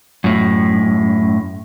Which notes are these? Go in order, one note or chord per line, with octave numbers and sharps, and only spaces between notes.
F#2 A2